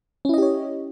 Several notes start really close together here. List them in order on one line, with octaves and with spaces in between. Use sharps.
C#4 E4 D#5 G4 C#5